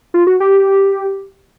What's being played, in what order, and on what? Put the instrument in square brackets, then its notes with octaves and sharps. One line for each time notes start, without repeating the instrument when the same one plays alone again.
[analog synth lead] F4
F#4
G4